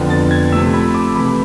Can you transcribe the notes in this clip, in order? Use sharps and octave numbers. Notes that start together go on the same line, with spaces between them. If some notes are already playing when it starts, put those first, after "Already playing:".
Already playing: F2 D3 F3 B3
A6
G#6
C3 F3 A3 E6
B5
D6
C3 E3 A3 B5